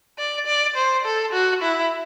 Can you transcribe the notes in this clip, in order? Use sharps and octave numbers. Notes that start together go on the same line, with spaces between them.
D5
D5
C5
A4
F#4
E4